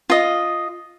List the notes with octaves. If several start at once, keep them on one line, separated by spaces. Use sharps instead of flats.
F4 D#5